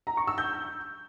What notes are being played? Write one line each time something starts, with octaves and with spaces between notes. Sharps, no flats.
A#5
C#6
E6
G6